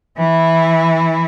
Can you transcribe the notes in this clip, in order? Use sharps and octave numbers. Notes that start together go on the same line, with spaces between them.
E3 E4